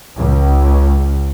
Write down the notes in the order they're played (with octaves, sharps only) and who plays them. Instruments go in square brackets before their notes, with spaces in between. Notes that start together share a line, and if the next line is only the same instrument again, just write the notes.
[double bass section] C#2